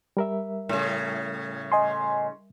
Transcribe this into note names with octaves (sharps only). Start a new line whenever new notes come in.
G3 A#4 E5
A2 C#3
D#5 G#5 C6